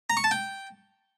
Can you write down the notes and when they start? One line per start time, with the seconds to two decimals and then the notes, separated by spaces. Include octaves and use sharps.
0.10 A#5
0.17 C#6
0.24 A5
0.31 G5